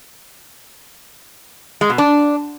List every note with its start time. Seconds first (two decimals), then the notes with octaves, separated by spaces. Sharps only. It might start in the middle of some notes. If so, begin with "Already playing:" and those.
1.81 G#3
1.90 B2
1.98 D4